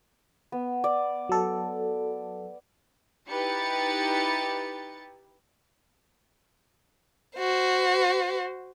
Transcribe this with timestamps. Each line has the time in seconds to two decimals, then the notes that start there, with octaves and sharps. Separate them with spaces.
0.52 B3
0.84 D5
1.29 F#3 A4
3.29 D#4 E4 G4 B4 A6 C#7
7.36 F#4 C5